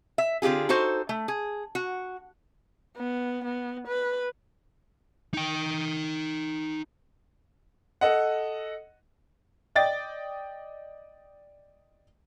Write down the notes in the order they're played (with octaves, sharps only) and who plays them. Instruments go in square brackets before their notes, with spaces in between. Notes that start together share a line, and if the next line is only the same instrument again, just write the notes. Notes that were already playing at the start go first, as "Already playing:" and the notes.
[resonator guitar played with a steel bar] E5
D3 C4 F4 G4 G#4
D#4 F#4 A4 C5
A3
G#4
F#4
[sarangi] B3
B3
B4
[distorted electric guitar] D#4 G5
[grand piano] A4 D#5 F#5
[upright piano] D5 D#5 G5 A6